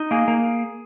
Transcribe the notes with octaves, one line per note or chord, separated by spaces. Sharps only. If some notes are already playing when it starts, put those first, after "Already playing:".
Already playing: D#4
A#3 G#4
A#3